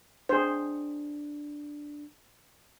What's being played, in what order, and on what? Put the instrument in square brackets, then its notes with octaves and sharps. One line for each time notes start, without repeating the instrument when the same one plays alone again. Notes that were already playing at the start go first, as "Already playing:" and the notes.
[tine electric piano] D4 [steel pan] G#4 C5